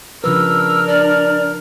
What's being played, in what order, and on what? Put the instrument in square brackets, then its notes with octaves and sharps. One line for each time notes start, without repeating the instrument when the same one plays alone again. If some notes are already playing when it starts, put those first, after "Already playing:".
[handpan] C#3 F3 B4 [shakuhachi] D4 [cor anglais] A#4 [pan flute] E6
[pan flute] D5